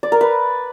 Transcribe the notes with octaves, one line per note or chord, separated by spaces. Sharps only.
D5
A#4
B4